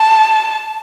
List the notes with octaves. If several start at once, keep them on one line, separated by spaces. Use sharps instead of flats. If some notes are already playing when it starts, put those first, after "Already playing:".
Already playing: A5